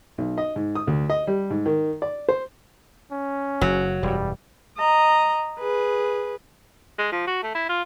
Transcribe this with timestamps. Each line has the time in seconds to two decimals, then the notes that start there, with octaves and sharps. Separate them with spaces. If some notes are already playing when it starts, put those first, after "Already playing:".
0.18 B1
0.38 D#5
0.56 G#2
0.75 D#6
0.87 D2
1.10 D#5
1.27 G3
1.50 G#2
1.66 D#3
2.02 D5
2.29 C5
3.12 C#4
3.61 F#1 F#3
4.03 E1 F#2 G3
4.77 D#5 A#5
5.60 G#4 B4
6.98 G#3
7.12 F3
7.27 F#4
7.43 A3
7.55 E4
7.69 F4